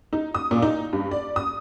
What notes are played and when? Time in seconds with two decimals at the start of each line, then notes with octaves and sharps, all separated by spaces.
0.13 D#4
0.34 D#6
0.51 A#2
0.62 D#4
0.93 G2
1.11 D5
1.36 D#6